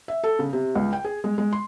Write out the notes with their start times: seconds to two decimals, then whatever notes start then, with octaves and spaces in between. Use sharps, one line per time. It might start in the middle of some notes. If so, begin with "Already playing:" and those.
0.08 E5
0.24 A4
0.39 C#3
0.53 C3
0.76 C#2
0.93 G5
1.05 G#4
1.24 G#3
1.38 G#3
1.53 C6